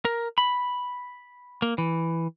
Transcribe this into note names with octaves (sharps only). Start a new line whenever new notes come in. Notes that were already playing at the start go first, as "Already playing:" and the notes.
A#4
B5
A#3
E3